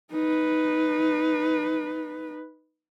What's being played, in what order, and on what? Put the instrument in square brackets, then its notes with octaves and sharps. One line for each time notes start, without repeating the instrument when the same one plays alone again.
[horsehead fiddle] D#4 B4